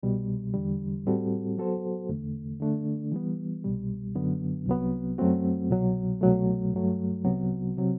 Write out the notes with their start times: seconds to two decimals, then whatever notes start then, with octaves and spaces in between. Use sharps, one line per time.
0.03 C2 B2 G3
0.54 E2 D3 G3
1.06 A2 G3 C4 F#4 A4
1.57 F#3 B3 F#4 A4 C5
2.09 E2 D3 A3
2.60 D3 A3 D4
3.12 E3 G3 B3
3.64 C2 B2 G3
4.15 F#2 D3 F#3 B3
4.67 C2 C3 F#3 B3
5.18 F#2 F#3 A3 C4 F#4
5.70 C2 B2 F#3
6.21 C2 B2 F#3 A3
6.73 G2 F#3 A3
7.25 C2 C3 F#3 B3 F#4
7.77 C3 F#3 C4